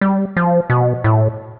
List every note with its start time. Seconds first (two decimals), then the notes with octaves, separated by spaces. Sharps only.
0.01 G3
0.37 F3
0.70 B2
1.04 A2